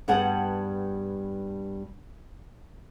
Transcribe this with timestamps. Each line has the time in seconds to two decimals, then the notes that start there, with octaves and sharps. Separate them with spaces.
0.08 G2 G3 B3 G#4 F#5 A5